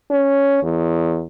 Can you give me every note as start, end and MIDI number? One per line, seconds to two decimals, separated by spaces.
0.11 0.58 61
0.63 1.24 40